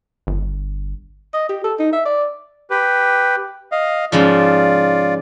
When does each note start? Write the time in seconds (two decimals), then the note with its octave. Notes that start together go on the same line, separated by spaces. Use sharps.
0.27 G1
1.34 D#5
1.49 G4
1.64 A4
1.80 D#4
1.93 E5
2.06 D5
2.70 G4 B4
3.72 D#5 F5
4.12 G#2 C#3 F3 F4 D5